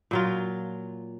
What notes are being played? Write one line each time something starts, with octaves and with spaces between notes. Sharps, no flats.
A#2 F#3 F4